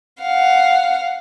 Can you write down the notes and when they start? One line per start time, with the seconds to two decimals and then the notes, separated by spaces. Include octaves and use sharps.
0.21 F5 F#5